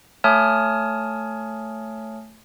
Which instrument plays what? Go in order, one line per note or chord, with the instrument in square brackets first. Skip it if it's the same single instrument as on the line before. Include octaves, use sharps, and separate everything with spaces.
[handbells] A3 C#5 G#5 A5 D#6 F6